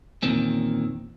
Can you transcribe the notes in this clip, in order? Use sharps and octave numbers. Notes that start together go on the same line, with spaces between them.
E2 A#2 D#3 A#3 C4 C#4